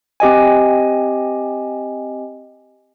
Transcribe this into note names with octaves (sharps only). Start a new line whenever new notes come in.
C4 G4 D#5 G#5